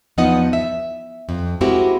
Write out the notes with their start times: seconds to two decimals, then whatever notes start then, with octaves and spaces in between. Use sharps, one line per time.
0.18 E2 F3 B3 D#4 D#5 F#5
0.53 E5
1.29 F2
1.61 G#3 A#3 C4 E4 F#4 G4